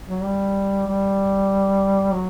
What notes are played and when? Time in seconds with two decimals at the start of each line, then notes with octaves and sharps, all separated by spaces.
0.08 F#3
0.24 G3
0.87 G3
2.13 F#3